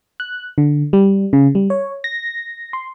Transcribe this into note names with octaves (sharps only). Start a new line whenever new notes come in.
F#6
D3
G3
C#3
G3
C#5
A#6
C6